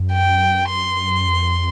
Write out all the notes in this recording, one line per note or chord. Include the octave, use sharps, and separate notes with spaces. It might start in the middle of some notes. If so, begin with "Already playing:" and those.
Already playing: F#2
G5
C6
F2